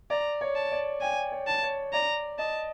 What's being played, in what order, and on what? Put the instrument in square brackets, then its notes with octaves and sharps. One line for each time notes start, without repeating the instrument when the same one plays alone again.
[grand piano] D5 [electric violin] A#5
[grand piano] C#5
[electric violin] A5
[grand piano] D5
[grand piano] G5 [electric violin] G#5
[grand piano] C#5
[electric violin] A5
[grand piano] C#5
[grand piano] D5 [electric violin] A#5
[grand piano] D#5 [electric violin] A5